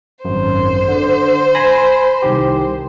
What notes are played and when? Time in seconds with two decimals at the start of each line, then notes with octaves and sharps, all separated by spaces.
0.25 G#1 F#2 C5
0.88 D3
1.55 G#5 B5 A#6
2.22 C2 D#3 G4